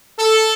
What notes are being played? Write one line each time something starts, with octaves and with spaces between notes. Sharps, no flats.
A4